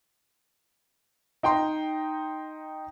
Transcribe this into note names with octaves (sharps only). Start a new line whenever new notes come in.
D#4 G5 A#5 C6